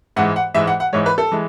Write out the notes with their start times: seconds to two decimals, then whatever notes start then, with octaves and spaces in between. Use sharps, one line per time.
0.16 G#2 E3 G#3 F#5
0.36 F#5
0.54 G#2 E3 G#3 E5
0.67 F#5
0.80 F#5
0.93 G#2 E3 G#3 C#5
1.06 B4
1.18 A4
1.31 E3 G#3